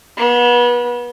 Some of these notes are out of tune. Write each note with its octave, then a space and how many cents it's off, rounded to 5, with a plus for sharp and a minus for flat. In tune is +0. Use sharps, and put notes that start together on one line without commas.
B3 -30